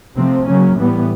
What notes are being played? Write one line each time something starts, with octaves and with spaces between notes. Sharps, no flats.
C3 F3 A3 C4
C#3 F#3 A#3 C#4
A2 E3 G3 B3